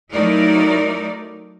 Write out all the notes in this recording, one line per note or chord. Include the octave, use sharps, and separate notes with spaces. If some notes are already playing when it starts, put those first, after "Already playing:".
F#3 A3 D#4 E4 A#4 D5